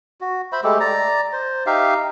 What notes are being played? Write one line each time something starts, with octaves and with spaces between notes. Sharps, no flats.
F#4
C5 E5 B5
G#3 A3 G4 A4
D5 A#5
C5
D#4 G4 E5 F5